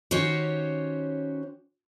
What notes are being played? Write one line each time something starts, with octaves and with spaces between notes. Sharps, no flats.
D#3 C#4 F#4 G4 C5 C#5